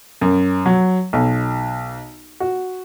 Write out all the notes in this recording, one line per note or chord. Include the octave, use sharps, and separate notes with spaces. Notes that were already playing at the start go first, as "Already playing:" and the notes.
F#2
F#3
B1
F#4